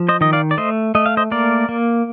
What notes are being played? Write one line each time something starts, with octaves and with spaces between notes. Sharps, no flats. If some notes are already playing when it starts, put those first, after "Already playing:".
Already playing: F3
C5 D#5
D#3 D#5
D5 F5
D5
A3 C5 D#5
A3 D#5
F5
C5 D#5
A#3 A#4 D5
A#3